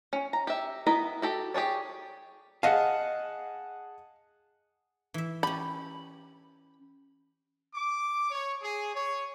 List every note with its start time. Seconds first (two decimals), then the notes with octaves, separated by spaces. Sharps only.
0.13 C#4
0.33 A#5
0.47 G4 E5
0.87 B3 E4 B4 D#5 A#5
1.22 F#4 G4 A4
1.54 G4 G#4 C#5 D5
2.63 G#4 D#5 F5 F#5 A5
5.14 E3 E5
5.43 C#4 G4 B5
7.75 D6
8.31 C#5
8.63 G#4
8.94 C#5